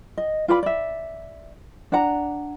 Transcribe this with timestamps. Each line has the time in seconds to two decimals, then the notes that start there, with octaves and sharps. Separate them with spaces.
0.17 D#5
0.48 F4 B4 D5 B5
0.63 D5 E5
1.92 D4 D5 F#5 A#5